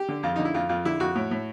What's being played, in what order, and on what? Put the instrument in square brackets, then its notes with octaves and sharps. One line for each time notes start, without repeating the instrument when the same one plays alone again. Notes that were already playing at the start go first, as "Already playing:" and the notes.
Already playing: [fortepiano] G4
D3
F2 F4
D3 D#4
E4
F2 F4
F2 F4
D3 E4
F2 F#4
A2
A2